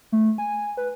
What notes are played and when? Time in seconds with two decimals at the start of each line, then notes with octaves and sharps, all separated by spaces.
0.12 A3
0.38 G#5
0.77 B4